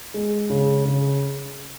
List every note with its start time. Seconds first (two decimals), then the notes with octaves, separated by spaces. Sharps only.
0.14 G#3
0.50 C#3
0.85 C#3